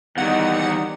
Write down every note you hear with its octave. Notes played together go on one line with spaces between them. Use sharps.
E2 D#3 G3 D#4 F#5